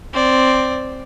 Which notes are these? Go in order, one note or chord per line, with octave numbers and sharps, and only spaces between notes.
C4 D5